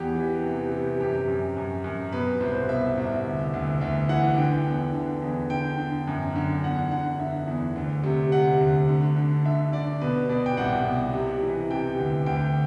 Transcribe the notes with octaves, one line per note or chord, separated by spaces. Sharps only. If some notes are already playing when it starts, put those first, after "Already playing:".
Already playing: E2 G4
E3
C3
C3
F#2 G4
F#2
F#2
F#2
B2 B4
C2 C5
B2 E5
C2
D2
D2
D2 E5
E3 F#5
D3 G5
E2
D3
E2
D3 G5
D3
F#2
D3
E2 F#5
D3 F#5
D3 E5
E2
D2
C3
C3 F#5
D2
D3
D3
D3 E5
D3 D5
B2 B4
B2 D5
G5
C2 F#5
B2
C3
E3
C3 G5
D2
D2 G5